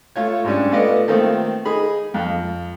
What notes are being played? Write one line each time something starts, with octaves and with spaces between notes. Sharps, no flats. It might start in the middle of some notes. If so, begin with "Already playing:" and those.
A3 F4 C#5
G#2 G3 C#4 D4
A3 B3 F4 B4 D5 D#5
D#3 A3 A#3 C4 F4
D#4 G#4 B5
F2